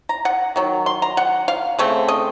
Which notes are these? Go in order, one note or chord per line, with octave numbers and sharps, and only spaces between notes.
A#5
F#5
D#3 F#3
C6
A#5
F#5
F5
C#3 A3 C4
D#5